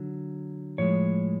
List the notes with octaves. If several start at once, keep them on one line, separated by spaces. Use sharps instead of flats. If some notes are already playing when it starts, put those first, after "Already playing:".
Already playing: D3 F#3
A2 F3 G#3 C#5